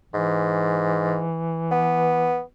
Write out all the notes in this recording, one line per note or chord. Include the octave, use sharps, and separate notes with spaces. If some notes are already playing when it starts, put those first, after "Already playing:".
G#2 E3
B3